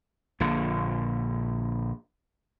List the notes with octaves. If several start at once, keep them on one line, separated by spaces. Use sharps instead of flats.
A#1 A#2 D3